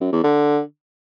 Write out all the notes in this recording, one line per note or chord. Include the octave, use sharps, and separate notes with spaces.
F#2
E2
D3